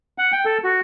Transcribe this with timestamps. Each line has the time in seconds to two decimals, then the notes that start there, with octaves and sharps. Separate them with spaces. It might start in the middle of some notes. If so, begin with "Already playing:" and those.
0.18 F#5
0.32 G5
0.45 A4
0.64 F#4